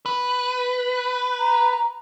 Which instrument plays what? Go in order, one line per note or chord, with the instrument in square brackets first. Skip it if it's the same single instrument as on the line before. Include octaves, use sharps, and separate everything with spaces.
[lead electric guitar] B4
[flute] A#5